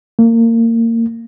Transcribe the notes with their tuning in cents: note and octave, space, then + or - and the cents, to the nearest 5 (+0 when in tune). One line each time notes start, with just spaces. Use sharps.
A#3 -25